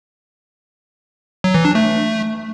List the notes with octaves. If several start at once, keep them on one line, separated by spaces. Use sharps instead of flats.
F#3
E3
D4
A3